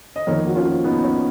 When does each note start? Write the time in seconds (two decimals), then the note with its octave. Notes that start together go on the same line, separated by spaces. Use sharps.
0.16 D#5
0.27 F2 D#3 A#3 A#4 C#5
0.47 F#4
0.56 C#4 F4
0.84 B3 D#4
1.03 C#4